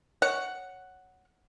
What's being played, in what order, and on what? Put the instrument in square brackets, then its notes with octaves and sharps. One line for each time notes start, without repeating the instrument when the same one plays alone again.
[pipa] C#5 F#5